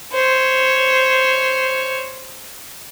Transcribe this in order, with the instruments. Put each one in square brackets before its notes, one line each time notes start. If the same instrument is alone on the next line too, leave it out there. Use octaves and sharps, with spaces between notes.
[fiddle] C5 C#5